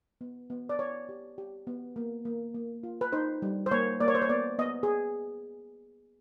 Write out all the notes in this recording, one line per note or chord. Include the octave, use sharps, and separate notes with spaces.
B3
B3
D5
E4 C#5
G4
G4
B3
A#3
A#3
A#3
F4
B4
D#4 C5
G3
C5
A#3 C#5
A#3 D5
C#5
C5
C#5
B3 D5
B3 D#5
G#4